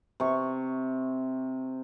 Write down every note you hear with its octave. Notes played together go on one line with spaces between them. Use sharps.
C3 C#6